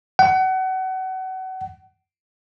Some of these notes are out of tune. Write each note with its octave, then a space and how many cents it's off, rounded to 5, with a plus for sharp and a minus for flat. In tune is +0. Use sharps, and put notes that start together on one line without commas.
F#5 +30